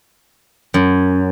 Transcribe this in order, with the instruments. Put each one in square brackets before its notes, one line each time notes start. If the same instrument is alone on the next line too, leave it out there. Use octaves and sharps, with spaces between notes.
[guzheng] F#2